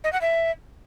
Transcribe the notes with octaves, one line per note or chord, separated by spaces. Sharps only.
D#5
F#5
E5